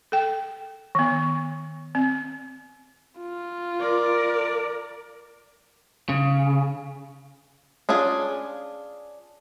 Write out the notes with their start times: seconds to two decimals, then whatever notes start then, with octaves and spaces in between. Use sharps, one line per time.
0.12 A4 G5
0.95 D#3 B3
1.95 C4
3.20 F4
3.80 A#4 D5
6.09 C#3
7.89 C#4 D4 F4 G#4